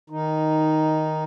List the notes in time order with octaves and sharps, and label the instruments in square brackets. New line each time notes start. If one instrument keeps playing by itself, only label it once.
[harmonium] D#3 D#4